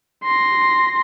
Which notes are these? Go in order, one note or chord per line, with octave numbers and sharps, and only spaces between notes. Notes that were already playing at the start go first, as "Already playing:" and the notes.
C6 A#6